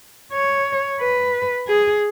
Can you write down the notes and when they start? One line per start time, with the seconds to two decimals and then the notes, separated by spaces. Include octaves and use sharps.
0.33 C#5
1.00 B4
1.68 G#4